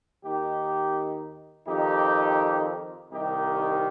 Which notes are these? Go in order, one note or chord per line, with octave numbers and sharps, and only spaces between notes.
D#2 D#3 D#4 G4
F2 D#3 D#4 G4
C2 C3 D#3 D#4 G4